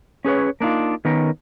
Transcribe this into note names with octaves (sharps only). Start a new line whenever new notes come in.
C#4 G#4 B4 C#5
A#3 D4 D#4 F4
D#3 B3 C#4 A#4